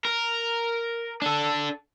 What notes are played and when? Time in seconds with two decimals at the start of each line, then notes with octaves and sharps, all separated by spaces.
0.05 A#4
1.22 D4 A4